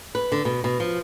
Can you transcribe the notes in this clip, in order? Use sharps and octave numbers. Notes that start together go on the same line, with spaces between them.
B4
D3
B2
B2
F3